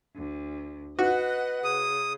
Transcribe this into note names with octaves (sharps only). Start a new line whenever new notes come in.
D2
F#4 B4 D#5 F#5
C#3 D#6